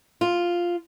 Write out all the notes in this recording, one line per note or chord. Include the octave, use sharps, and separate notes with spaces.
F4